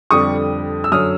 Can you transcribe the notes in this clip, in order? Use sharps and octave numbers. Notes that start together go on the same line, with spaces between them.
F2 D3 G3 C#6 D#6
E6
F#2 D3 F#3 D#6 F6